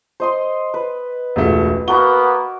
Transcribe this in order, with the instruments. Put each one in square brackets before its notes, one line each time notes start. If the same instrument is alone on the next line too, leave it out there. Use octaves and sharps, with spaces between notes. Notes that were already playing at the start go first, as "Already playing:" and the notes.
[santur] C5 D#5 C6
B4
[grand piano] E1 C#2 A3
[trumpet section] A#3 B3 [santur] F#4 A#4 A#5 [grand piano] G7